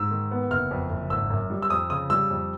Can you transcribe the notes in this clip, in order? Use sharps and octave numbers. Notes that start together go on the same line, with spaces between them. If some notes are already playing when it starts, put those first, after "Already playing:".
Already playing: G#2 E6
D#3
B3
F#1 F6
F2
F#1
G#1 E6
F#2
G3
E6
F2 D#6
C#3 D#6
G3 E6
F2